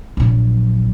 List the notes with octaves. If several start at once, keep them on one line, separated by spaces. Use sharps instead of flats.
A#1 F#3